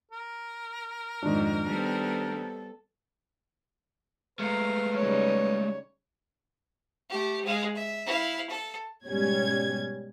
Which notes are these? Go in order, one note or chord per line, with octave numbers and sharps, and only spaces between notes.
A#4
F2 G#2 D#3 D4
G3 B3 C4 A4
G#3 A3 B4 F5 A#5
C#3 G3 D#4 C#5
A3 G4
G#3 F5
E5
E4 F5
A4
G#2 B2 G3 C#4 G#6